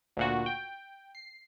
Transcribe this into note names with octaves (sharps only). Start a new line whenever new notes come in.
D2 A#2 F#4
G5
C7